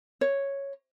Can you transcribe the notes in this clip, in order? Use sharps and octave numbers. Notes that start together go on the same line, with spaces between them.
C#5